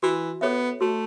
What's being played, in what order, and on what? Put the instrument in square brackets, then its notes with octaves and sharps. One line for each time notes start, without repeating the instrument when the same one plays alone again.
[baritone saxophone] E3 [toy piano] F#4
[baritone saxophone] B3 [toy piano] A4 C#5 E5
[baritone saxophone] A3 [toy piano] F#4